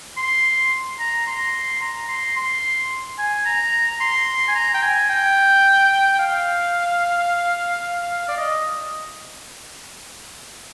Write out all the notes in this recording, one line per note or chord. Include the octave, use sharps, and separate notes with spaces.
C6
A#5
C6
A#5
C6
C6
G#5
A#5
C6
G#5
A#5
G5
G#5
G5
F5
D5
D#5